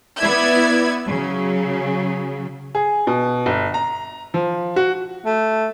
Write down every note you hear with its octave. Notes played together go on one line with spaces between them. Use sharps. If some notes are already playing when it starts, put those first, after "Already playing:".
B3 E4 D5 E5 G#6
C#3 F#3
G#4
B2
G1
A#5
F3
F#4
A3